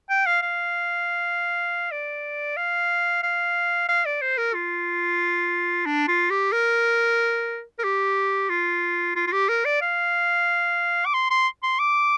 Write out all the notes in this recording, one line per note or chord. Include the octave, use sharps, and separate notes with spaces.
G5
F5
F5
D5
F5
F5
F5
D5
C5
A#4
F4
D4
F4
G4
A#4
A#4
G4
F4
F4
F4
G4
A#4
D5
F5
D6
C6
C6
C6
D6